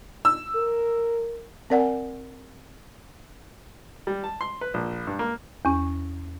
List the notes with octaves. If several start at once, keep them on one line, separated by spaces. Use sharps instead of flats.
E6
A#4
C4 A#4 D5 F#5 G#5
G3
A5
C6
B4
A#1
G2
A#3
E2 C#4